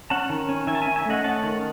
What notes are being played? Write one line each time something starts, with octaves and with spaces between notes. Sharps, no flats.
C#4 F#5 A5
D#3
C#4
D#3 E5 G#5
A5
C#4 E5 G#5
E5 G#5
A3 D#5 F#5
C#4 F#5 A5
D#3